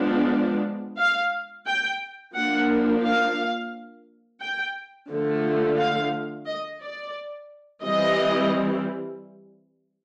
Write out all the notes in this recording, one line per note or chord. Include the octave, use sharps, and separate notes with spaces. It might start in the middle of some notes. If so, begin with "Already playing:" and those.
Already playing: F3 G#3 B3 D4
F5
G5
F3 A#3 D4 F#5
F5
G5
D3 F3 A3
F5
D#5
D5
E3 G3 C4 D#5